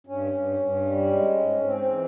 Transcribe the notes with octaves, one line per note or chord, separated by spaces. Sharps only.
G2 C#4
G2
G2
G3
G#3
G#2
G#2 C4
E3